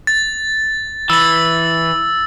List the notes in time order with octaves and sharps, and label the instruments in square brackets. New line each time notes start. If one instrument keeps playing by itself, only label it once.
[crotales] A6
[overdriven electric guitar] E3 [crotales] E6 A6